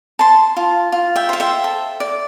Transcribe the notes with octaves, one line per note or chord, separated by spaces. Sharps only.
C5 A5 C6
F4
F4
E5 G5
C5 F5
E5 G5
A4
D5